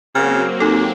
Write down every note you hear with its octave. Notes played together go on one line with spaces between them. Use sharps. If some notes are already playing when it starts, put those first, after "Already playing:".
C#3 F#3 A#3 C4 F6
D#2 D#4 A4